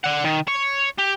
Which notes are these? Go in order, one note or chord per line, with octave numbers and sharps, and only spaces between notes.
D5 F#5
D#3
C#5
G4